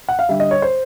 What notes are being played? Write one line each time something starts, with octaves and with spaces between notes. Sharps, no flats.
F#5
F5
D3 G3 E5
D#5
C#5
C5